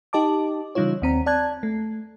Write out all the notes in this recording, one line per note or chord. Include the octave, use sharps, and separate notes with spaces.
D#4 G4 D#5 A5 D6
C#3 E3 G3 D#4 F4 C#5
D#2 C4 A#5
D5 A5 F#6 G#6
A3